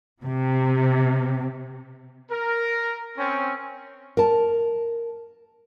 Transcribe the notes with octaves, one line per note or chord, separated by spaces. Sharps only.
C3
A#4
C4 C#4
A#4 A5